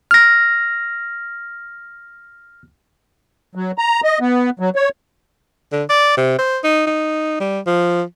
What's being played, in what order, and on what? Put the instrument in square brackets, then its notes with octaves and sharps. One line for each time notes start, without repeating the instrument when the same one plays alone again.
[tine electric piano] F6 A#6
[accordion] F#3
A#5
D#5
B3
F#3
C#5
[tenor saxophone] D3
D5
C3
C5
D#4
D#4
G3
F3